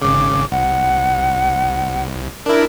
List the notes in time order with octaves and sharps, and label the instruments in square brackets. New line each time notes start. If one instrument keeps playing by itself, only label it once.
[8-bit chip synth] G#1 C#3 [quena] D6
[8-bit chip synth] C2 [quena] F#5
[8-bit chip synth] D4 E4 [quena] A#4